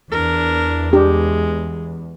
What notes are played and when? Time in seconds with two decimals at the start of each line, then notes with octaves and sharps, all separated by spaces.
0.11 E2 D4 A#4
0.93 G#3 D4 G4